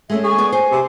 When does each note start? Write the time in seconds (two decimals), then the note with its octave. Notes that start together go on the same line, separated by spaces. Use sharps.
0.10 G#3 A3 C#4 E5
0.24 G#4 C#6
0.38 B3 D5
0.52 C5 G#5
0.71 C3